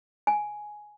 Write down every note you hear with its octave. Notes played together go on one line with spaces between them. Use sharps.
G#5